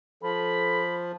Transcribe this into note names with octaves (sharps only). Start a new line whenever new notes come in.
F3 A4 B5